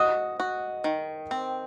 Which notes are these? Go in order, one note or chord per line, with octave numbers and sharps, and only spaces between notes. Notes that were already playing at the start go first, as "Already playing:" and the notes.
Already playing: F#4 D#5 D#6
F#4
D#3
C4